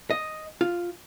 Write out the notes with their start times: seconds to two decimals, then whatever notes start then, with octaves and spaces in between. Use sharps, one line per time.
0.10 D#5
0.61 F4